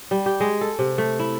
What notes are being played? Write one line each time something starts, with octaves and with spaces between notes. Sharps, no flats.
G3
G4
G#3
A4
C3
A3
E4